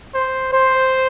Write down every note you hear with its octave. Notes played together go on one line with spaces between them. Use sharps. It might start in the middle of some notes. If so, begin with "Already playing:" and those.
C5
C5